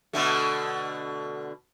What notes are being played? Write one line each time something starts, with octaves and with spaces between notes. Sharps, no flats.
B2 D3 A3